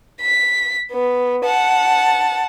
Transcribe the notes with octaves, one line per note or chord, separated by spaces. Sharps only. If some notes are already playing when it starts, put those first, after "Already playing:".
B6
B3
F#5 A5